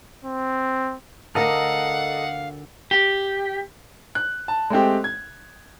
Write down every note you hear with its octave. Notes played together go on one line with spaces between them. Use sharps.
C4
D2 D3 A4 A#4 D#5 F5 F#5 A#5
G4
F#6
A5
G#3 A3 C4 G4
G#6